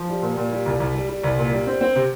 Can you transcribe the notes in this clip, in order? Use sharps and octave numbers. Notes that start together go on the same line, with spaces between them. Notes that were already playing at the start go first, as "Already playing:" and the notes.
Already playing: F3
G3
A#2
A#2
G3
C2
C2
G3
G3
C2
A#2
G3
C4
C4
C3